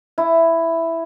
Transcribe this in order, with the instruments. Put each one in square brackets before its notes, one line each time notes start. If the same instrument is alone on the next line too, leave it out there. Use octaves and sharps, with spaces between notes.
[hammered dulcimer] E4